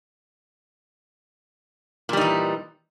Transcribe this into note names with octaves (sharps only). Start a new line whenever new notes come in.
A#2 E3 G3 D#4